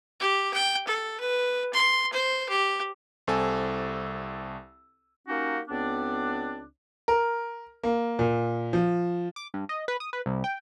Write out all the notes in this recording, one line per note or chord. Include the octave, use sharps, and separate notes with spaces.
G4
G5
A4
B4
C6
C5
G4
C2 C4 A4 G#5 E6
A#3 C#4 D#4 F#4 G4 F5
C#2 B3 C4 D4
A#4
A#3
A#2
F3
D6
G2
D#5
B4
D#6
B4
C2
G5